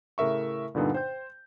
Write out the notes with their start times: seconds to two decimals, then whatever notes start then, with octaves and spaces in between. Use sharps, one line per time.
0.18 A2 C#3 A#4 E5 C#6
0.75 G2 A#2 D3 B3 D#4
0.94 C5 G5 G6